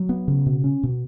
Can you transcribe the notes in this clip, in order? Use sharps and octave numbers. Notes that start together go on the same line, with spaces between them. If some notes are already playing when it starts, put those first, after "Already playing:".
Already playing: F#3
B3
C#3
B2
C#4
B2